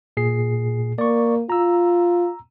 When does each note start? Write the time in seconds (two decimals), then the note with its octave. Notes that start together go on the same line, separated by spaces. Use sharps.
0.17 A#2 G#4 C7
0.98 A#3 D5 C#6
1.50 F4 A#5 E6